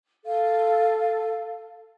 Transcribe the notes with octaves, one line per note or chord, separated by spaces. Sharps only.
A4 F5